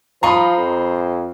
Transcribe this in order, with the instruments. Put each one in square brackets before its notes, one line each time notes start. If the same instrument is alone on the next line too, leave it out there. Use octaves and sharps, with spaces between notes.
[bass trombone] F3 [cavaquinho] F4 D#5 C#6 [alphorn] C5 [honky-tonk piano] A#5 B5
[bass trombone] F2